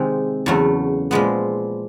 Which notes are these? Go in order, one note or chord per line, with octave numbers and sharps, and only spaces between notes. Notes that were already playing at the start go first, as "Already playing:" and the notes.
Already playing: C3 D#3 G#3
E2 C#3 F#3 A3
A#2 F3 G#3 B3